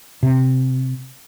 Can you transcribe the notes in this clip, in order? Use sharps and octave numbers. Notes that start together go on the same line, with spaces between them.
C3